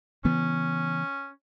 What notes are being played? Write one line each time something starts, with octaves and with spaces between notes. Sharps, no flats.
C#3 E3 B3 C#4